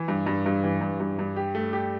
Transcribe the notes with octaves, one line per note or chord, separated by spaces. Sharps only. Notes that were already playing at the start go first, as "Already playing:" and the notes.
Already playing: E3
G2
G2
G2
E3
G2
G2
G2
G4
A3
G4